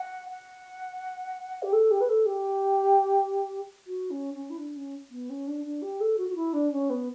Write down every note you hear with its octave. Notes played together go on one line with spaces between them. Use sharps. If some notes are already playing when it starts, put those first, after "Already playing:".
Already playing: F#5
F#5
G4
A4
G4
B4
A4
G4
F#4
C#4
C#4
E4
D4
C#4
B3
C#4
D4
D4
G4
A4
F#4
F#4
E4
D4
C#4
B3